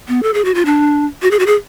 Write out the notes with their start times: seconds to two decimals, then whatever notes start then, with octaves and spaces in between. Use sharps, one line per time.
0.08 B3
0.23 A4
0.34 G#4
0.45 F#4
0.55 F4
0.65 D4
1.22 F#4
1.31 G#4
1.39 F#4
1.46 G#4